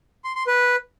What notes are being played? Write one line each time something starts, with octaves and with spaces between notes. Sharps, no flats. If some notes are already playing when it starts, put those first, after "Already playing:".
C6
C6
B4